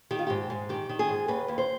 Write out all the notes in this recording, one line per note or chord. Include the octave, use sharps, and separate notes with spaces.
D#3 G4
F4
G#2 G4
G#2
D#3 G4
D#3
G#4
G#2
D#2 B4
D#2
C5